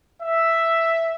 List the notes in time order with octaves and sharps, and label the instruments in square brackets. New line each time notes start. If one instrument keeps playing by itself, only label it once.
[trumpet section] E5